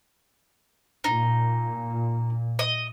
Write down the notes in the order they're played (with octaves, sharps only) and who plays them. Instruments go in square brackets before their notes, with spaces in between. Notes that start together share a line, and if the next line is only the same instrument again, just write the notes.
[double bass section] A#2 [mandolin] D#4
[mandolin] D#5